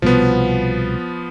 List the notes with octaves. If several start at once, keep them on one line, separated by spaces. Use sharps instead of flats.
C2 B2 F3 B3